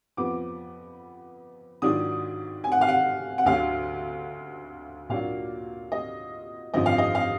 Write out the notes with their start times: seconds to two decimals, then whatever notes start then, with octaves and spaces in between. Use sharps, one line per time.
0.17 F2 F3 B3 D6
1.82 G#2 D#3 F#3 D4 F4 D#6
2.64 G#5
2.72 F#5
2.81 F5
2.89 F#5
3.38 F#5
3.46 D2 D3 F#3 F5
5.09 A#2 F#3 A#3 D4 F4 F5
5.92 D#5
6.74 G#1 F#2 D3 F3 D#5
6.86 F5
6.98 D#5
7.15 F5